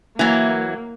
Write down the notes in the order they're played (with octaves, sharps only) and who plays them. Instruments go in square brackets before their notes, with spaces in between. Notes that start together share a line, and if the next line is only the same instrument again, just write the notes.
[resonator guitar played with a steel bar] E3 F#3 [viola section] A#3